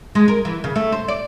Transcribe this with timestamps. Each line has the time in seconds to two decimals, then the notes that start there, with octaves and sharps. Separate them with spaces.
0.15 G#3
0.28 A#4
0.45 E3
0.64 C#3
0.76 A3
0.92 C5
1.08 D5